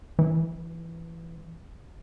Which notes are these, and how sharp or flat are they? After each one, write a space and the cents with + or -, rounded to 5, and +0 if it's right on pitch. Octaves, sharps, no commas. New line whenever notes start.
E3 +10